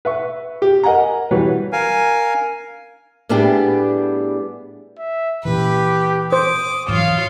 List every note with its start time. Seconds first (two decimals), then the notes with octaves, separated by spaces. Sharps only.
0.05 B4 E5 C#6
0.62 G4
0.83 A#4 D#5 F#5 G#5 A#5
1.31 E3 F#3 G3 F#4 B4 C#5
1.72 A#4 F5 G#5
3.29 A2 G3 B3 D4 G4 G#4
4.99 E5
5.45 A#2 E3 G4 B4
6.33 C5 D6 D#6
6.88 G#2 E3 F#3 F4 C#5 F5